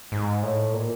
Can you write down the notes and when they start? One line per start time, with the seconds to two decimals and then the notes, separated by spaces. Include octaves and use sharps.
0.12 G#2
0.43 A2
0.73 A#2